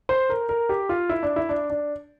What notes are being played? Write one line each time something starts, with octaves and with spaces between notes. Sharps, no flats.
C5
A#4
A#4
G4
F4
E4
D4
E4
D4
D4